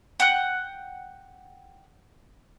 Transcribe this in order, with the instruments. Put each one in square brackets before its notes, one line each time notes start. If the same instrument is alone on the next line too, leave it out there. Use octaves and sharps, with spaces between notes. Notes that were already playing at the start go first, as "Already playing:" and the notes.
[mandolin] F#5 G5 F#6